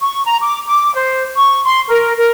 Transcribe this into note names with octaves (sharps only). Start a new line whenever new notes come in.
C#6
A#5
D6
D6
C5
C#6
C6
A#4
A#4